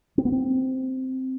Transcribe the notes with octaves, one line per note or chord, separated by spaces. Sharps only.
C4
B3
C4